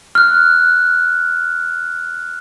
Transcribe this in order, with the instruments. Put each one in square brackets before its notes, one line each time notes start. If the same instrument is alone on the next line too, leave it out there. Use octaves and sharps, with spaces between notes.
[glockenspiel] F6 F#6